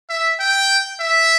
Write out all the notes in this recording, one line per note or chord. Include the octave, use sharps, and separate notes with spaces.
E5
G5
E5